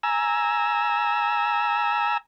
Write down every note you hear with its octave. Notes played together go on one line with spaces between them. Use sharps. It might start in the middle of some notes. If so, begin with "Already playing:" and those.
G#5 A#5 E6